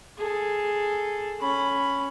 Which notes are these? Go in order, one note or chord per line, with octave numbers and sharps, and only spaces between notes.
G#4 A4
C#4 B5